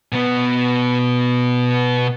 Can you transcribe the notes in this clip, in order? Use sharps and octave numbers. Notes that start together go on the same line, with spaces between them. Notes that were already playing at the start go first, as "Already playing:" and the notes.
B2 B3